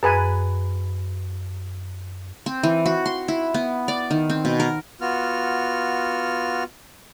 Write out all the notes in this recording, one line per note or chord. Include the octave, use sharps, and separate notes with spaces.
F#2 G#4 B4 G#5
C4
E3
F#4
C6
E4
B3
D5
D#3
C4
B2
A#4
B3 F4 F#4 F6